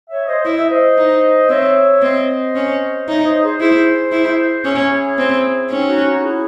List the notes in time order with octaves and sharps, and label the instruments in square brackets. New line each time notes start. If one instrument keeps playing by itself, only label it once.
[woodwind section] C#5 E5
C5 D#5
[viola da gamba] E4 [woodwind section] D#5
[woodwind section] E5
C5 D#5
[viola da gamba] D#4
[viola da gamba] C4 [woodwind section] C#5 E5
[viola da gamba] C4 [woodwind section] C5 D#5
[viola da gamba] C#4
[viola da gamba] D#4 [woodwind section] C#5 E5
[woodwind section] C5 D#5
G#4 C5
[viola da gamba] E4 [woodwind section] G#4 C5
[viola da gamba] E4
[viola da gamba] C#4 [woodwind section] E4 G#4
[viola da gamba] C4
[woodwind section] C4 D#4 [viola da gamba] C#4
[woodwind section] D#4 F#4
D#4 F#4
E4 G#4